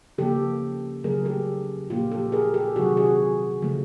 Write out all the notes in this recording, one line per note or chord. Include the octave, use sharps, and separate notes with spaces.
C#3 F3 A#3 G4 A4
C#3 F#3 A3 G#4 A#4
G4 A4
A#2 F3 A#3 F4 G4
G4 A4
G#4 A#4
G4 A4
C3 D#3 F#3 F#4 G#4
F#4 G#4
C#3 F3 A3